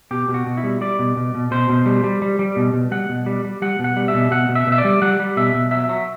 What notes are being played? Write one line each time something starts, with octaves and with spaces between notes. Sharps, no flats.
B2 G4
B2
F#4
B2
E4
G3
G3 D5
B2
B2
B2
B2 C5
B2
G3
G3
G3
G3
B2
B2
G3 F#5
B2
G3
G3
G3 F#5
B2
F#5
G3
E5
B2
B2 F#5
B2
E5
B2
E5
D5
G3
G3 F#5
G3
B2 E5
B2
F#3 E5
F#3